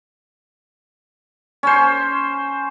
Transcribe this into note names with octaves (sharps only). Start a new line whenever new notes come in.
C#4 C5